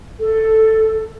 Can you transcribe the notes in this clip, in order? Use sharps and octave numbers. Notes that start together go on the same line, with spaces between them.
A4